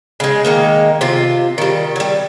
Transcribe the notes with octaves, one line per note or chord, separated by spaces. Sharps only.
C#3 G#3
D#3 G#3 A#3
C3 F4
D#3 G3
F#3 G3